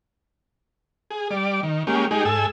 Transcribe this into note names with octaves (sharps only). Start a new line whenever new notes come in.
G#4
G3 D5
D#3
G#3 A#3 C#4 G4
G#3 D#4 G4 G#4
G#2 A4 G#5 E6